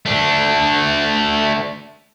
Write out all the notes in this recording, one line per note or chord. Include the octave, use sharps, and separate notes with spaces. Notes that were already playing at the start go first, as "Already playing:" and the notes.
A3 D4